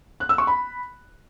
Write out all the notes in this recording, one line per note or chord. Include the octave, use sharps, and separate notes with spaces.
F#6
E6
C#6
B5